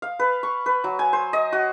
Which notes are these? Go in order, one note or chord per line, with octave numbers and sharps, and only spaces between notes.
F5
B4
C#6
B4
F#3
G#5
C5
D#5
F#4